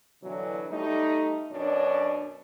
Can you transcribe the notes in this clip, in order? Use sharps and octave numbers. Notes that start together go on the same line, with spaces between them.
B2 D3 E3 F#3
G3 A3 D#4
F#2 B2 D4 C#5